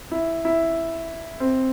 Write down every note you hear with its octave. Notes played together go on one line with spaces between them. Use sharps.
E4
E4
C4